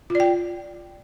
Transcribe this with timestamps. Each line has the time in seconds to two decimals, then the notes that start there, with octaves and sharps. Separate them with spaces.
0.10 F4
0.15 D5
0.20 G5